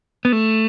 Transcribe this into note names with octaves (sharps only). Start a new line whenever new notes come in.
B3
A3